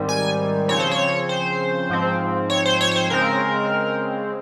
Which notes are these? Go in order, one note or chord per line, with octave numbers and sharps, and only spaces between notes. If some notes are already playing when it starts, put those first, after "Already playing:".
Already playing: G#2 D#3 G3 C4
G#5
C#3 F3 C4 C#5
C5
C#5
C5
G#2 F3 C4
C#5
C5
C#5
C#5
C5
C#3 G#3 C4 A#4